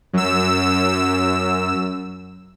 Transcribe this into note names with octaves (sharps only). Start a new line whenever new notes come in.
F#2 E6